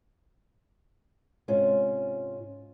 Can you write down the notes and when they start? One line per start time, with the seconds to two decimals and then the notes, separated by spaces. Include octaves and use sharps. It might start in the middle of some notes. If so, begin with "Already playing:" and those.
1.48 G#2 C3 C#4 F4